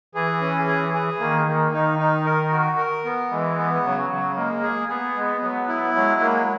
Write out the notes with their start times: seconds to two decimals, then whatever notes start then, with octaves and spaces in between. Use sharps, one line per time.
0.15 E3 G#4
0.41 C#4
0.67 G#4
0.94 G#4
1.20 D#3 A#3
1.47 A#3
1.73 D#3 D#4
1.99 D#4
2.25 A#4
2.52 F#4
2.78 A#4
3.05 B3
3.30 E3 G#3
3.57 B3
3.83 C#3 F#3
4.10 C#3
4.36 G#3 A#3
4.63 G#4
4.89 B3 G#4
5.15 G#3
5.42 F#3 B3
5.68 E4
5.95 F#3 G#3
6.21 A#3